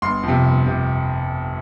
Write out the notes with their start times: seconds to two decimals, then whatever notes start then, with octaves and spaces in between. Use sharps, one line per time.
0.02 G1 C6
0.23 F2 C3
0.45 G1
0.66 C3